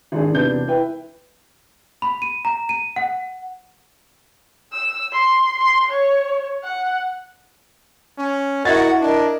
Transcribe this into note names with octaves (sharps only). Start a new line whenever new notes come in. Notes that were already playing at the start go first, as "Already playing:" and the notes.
G#1 D4 G#4
E1 C3 B3 D4 G6
E4 B4 G5
B5
D#7
A#5
D#7
F#5
E6
C6
C6
C#5
F#5
C#4
E4 F#4 A#4 D#5 F#5 G#6 A6
D4 A#4 D#5